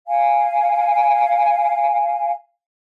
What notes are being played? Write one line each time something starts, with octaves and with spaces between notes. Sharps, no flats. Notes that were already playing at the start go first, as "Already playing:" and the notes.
F5 G#5